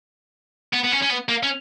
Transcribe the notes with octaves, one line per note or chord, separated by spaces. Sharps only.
B3
B3
C#4
C#4
B3
A#3
C#4